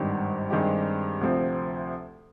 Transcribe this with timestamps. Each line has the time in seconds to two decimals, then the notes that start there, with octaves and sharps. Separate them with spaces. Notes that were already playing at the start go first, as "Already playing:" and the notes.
Already playing: G#1 G2 D#3 G3
0.50 G2 D#3 G#3 C4 G4
1.21 D2 C3 F3 C4